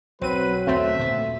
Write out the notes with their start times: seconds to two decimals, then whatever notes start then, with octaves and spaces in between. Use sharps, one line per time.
0.21 B1 F#3 C4 B4 D#7
0.67 D#2 D3 A3 C4 E5
0.99 A#2 G3 B3